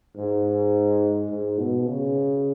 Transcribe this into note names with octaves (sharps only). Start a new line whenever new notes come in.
G#2
G#2
B2
C#3